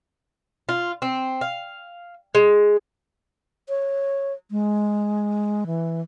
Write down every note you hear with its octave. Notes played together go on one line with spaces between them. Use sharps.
F4
C4
F5
G#3
C#5
G#3
E3